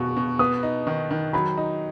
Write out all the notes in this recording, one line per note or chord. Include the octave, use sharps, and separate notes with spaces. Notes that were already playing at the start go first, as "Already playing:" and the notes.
Already playing: B2 B3 F#4 C#6
B2
B3 D#6
D#4
D#3
D#3
F#3 B5
D#4